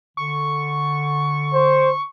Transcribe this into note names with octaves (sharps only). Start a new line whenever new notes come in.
D3 C#6
C5